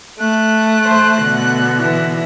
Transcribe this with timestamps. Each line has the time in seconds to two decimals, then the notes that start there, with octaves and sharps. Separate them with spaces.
0.20 A3 F#6
0.85 C5
1.21 B2 D3
1.80 E3